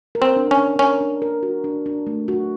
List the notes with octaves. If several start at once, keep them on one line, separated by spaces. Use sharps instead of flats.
A#4
C4
D4
C#4
D4
C#4 A#4
D4
A#4
F#4
D4
D4
A3
F#4